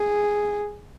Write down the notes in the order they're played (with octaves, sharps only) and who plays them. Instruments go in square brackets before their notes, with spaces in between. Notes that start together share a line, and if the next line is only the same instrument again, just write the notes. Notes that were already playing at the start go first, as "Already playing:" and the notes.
Already playing: [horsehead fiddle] G#4